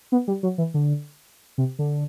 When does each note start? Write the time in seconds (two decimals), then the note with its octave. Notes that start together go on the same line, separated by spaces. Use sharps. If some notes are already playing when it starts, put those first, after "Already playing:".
0.12 B3
0.28 G3
0.43 F#3
0.58 E3
0.74 D3
1.58 C3
1.79 D3